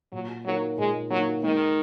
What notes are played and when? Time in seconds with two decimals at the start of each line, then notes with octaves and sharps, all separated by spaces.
0.12 A#2 F#3
0.45 F#3 A#3 D#4 A#4 C#5
0.77 A#2 G#3
1.10 F#3 A#3 D#4 A#4 C#5
1.43 D#3 G#3